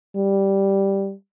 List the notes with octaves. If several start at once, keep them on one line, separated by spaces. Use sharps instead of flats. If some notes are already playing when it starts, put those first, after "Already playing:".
G3